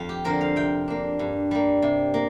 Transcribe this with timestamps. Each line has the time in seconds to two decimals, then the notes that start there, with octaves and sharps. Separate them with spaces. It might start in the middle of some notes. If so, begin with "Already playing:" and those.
Already playing: F2 F4
0.09 G4
0.24 D3 F3 C4 A#4
0.41 F5
0.56 C3 G5
0.88 A#3 D4
1.19 G2
1.51 G3 A#3
1.82 C3
2.14 A#3